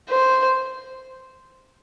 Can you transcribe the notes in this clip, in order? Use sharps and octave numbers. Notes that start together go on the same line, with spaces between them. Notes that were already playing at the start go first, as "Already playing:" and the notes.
C5